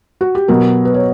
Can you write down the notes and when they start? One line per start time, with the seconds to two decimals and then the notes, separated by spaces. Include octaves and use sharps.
0.21 F#4
0.35 G4
0.48 B2 F#3 B3 A#4
0.85 B4
0.94 C#5